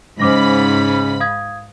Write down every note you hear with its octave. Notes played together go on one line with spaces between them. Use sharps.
G#2 C#3 C5 B5 D6 A#6
F5 D#6 G#6